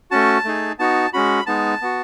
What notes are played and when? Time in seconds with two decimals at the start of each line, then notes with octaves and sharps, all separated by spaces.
0.11 A3 C#4 F#4 A5
0.45 A3 D#4 G#4
0.79 B3 D#4 F#4 A5
1.13 G#3 C#4 F#4 B5
1.46 G#3 B3 D#4 A5
1.82 B3 F#4